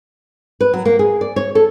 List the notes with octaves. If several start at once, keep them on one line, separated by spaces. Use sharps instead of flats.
B4
F#3
A#3
G#4
D5
C#5
A4